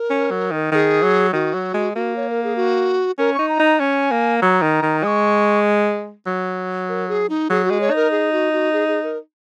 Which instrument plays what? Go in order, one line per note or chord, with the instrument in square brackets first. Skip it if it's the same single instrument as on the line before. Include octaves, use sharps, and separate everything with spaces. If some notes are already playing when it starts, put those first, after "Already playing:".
Already playing: [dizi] A#4
[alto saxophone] C#4
F#3
D#3
[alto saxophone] D#3 [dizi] G#4 A#4
[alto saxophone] F#3
[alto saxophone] D#3 [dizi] F#4
[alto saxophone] F#3
G#3
[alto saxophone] A#3 [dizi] F#4
[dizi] C#5
A#4
G#4
F#4
[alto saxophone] C#4 [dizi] A#4
[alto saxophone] D#4 [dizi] C#6
[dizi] A#5
[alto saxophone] D#4
[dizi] A#5
[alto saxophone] C#4 [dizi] G#5
[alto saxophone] A#3
[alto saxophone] F#3 [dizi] A#5
[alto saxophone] D#3
D#3
[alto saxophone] G#3 [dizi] D#6
[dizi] C#6
[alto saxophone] F#3
[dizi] A#4
G#4
D#4
[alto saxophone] F#3 [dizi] G#4
[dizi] F#4
[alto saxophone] G#3
[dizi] C#5
[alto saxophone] D#4
[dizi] A#4
G#4
F#4
F#4
G#4
G#4
A#4